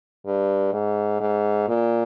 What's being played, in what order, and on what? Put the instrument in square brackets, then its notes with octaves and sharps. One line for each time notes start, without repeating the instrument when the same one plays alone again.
[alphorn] G2
G#2
G#2
A#2